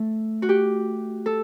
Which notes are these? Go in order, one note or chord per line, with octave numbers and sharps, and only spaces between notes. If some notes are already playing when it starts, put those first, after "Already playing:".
Already playing: A3
F#4
G4
A4